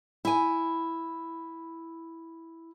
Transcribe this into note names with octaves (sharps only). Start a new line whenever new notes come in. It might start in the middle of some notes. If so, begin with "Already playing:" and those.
E4 G#5